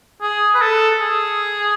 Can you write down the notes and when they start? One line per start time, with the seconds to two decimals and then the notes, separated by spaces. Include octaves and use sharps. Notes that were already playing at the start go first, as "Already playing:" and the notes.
0.22 G#4
0.54 B4
0.62 A4
1.01 G#4